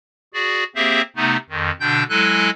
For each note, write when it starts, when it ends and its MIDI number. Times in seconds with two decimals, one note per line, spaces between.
0.34 0.64 66
0.34 0.64 68
0.34 0.64 74
0.75 1.02 58
0.75 1.02 60
0.75 1.02 67
0.75 1.02 68
0.75 1.02 72
0.75 1.02 76
1.16 1.37 48
1.16 1.37 57
1.16 1.37 59
1.16 1.37 63
1.50 1.71 41
1.50 1.71 51
1.80 2.03 47
1.80 2.03 50
1.80 2.03 62
1.80 2.03 79
1.80 2.03 91
2.09 2.50 54
2.09 2.50 56
2.09 2.50 64
2.09 2.50 69
2.09 2.50 80
2.09 2.50 90